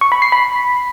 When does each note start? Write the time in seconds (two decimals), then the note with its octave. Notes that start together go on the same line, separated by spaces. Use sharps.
0.01 C#6
0.12 B5
0.22 C7
0.32 B5